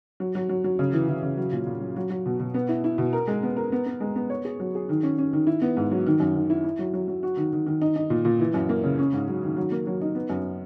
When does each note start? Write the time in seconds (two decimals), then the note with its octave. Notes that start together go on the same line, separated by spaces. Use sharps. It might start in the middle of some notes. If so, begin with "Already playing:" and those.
0.20 F#3
0.35 F#3
0.49 F#3
0.64 F#3
0.79 C#3
0.93 E3
1.09 E3
1.23 C#3
1.37 F#3
1.52 A#2
1.67 A#2
1.81 F#3
1.96 F#3
2.10 F#3
2.26 B2
2.40 B2
2.54 B3
2.69 E4
2.84 E4
2.98 B2
3.13 A#4
3.27 G#3
3.43 B3
3.57 A#4
3.72 B3
3.86 B3
4.01 G#3
4.16 B3
4.30 C#5
4.45 G#4
4.60 F#3
4.75 G#4
4.89 D#3
5.03 C#4
5.18 C#4
5.33 D#3
5.47 E4
5.62 B3
5.77 G#2
5.91 F#3
6.06 D#3
6.20 F#2
6.35 D#3
6.50 E4
6.64 E4
6.79 F#3
6.93 F#3
7.08 F#3
7.23 F#4
7.37 D#3
7.53 D#3
7.66 D#3
7.82 D#4
7.96 D#4
8.10 A#2
8.25 A#2
8.40 E3
8.54 F#2
8.69 A#3
8.84 C#3
8.99 C#4
9.13 G#2
9.28 F#3
9.43 D#3
9.56 F#3
9.71 A#3
9.87 F#3
10.01 D#4
10.15 B3
10.30 F#2